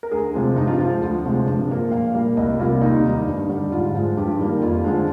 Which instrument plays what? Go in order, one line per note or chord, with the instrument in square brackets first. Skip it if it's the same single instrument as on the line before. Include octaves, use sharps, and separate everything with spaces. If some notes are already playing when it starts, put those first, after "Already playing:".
[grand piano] A#4
D2 G#4
C3 F3 G#3
G2 D#4
F4
F3 G#3
D2
C3 F3 G#3
G2
F3 A#3
A#2 F5
G3 A#3
C2 D#5
C3 G3 A#3 F4
D#2 D#4
D#3 G3
G2
D3 G3
G#2 F4
F3 G#3
G2 G4
D#3 G3 A#3
F2 F4
D3 F3 G#3